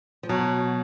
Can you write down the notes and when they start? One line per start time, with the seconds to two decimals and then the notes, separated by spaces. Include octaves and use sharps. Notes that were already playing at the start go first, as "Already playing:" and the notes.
0.23 F3
0.29 B2 F#3